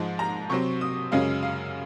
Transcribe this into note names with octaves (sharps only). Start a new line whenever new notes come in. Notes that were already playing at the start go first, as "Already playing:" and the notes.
Already playing: G#2 F3 G#3
A#5
C3 F#3 C4 C#6
D#6
F#2 C#3 G#3 C#4 F5
F5